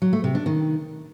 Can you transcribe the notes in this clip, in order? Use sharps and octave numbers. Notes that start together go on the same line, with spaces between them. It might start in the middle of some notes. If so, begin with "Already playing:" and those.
F#3
A3
C3
D4
D#3